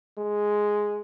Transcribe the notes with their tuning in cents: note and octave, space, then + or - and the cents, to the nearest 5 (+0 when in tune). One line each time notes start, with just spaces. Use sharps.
G#3 +0